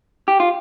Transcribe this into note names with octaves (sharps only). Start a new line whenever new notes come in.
G4
F4